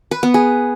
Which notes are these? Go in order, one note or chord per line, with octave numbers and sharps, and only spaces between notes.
B4
B3
G#4